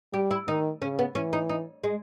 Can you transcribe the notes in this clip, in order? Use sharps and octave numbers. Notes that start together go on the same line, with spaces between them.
G3 G4
E4
D#3 D#4
C#3 C#4
B3
E3 C#4
D#4
D#4
G#3